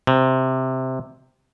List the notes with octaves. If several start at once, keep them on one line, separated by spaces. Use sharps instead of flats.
C3